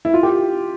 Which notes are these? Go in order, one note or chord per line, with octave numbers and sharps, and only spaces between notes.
E4
F4
G4